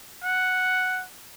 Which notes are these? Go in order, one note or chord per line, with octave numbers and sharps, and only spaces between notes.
F#5